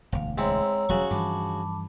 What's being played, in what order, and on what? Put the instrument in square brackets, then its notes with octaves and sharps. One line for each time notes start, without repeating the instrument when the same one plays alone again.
[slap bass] E1 D2 [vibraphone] F5
[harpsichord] G#2 C4 E4 [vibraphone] C#5 A#5 E6
[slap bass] E1 F#3 G3 [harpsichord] C#3 F#4 C#6
[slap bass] G2 E3 F3 [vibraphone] A5 B5 D6